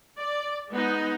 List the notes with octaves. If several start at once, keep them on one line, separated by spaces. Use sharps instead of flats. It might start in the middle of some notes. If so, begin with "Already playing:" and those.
D5
G#3 B3 D#4